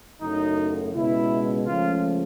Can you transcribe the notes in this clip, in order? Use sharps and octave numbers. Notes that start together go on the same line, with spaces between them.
F#1 F#2 C#3 F#3 A3 D#4
C#2 B2 G#3 E4
C#2 C#3 F3 A3 F4